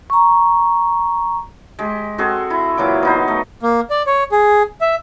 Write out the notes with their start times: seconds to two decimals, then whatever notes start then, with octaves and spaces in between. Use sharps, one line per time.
0.10 A#5 C#6
1.79 G#3 G4
2.18 C4 F#4 G#4 A4
2.50 E4
2.78 A#2 E3 F#3 D6
3.03 B3 D#4 C5
3.28 A3
3.63 A#3
3.90 D5
4.07 C#5
4.32 G#4
4.81 E5